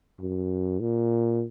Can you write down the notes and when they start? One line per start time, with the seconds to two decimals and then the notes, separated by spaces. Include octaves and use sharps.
0.19 F#2
0.80 A#2